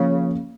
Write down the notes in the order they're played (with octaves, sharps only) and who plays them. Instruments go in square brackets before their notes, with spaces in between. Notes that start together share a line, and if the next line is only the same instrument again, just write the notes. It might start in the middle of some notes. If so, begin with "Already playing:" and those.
Already playing: [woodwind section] C#3 [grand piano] F3 A#3 C#4